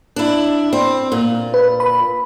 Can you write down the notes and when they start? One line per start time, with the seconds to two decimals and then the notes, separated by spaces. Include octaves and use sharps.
0.16 D4 E4
0.73 C4
1.12 A#2
1.54 B4
1.80 B5